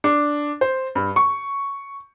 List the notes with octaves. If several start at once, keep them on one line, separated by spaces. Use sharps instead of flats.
D4
C5
G2
C#6